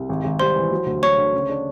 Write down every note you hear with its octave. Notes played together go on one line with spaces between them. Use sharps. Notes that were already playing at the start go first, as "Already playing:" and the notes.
Already playing: C2
G#1
G#1
G3 C5 C6
E3
F#3
D2
A3 C#5 C#6
D3
C#3
D4